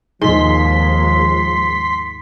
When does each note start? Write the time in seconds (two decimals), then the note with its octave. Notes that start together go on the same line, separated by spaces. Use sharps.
0.21 D#2 G#2 F3 G#3 C6 B6